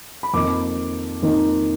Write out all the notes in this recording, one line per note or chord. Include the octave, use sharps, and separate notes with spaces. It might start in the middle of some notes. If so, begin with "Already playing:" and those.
B5
F2 D#3 A#3 D#4 D6
F2 D#3 A#3 D#4